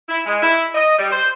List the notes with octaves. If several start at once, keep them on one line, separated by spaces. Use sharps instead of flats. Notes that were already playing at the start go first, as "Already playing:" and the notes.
E4
G#3
E4
D#5
G3
C5